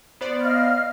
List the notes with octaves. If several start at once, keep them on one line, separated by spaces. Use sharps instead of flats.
B3 C5 D5
D#5 F5 F6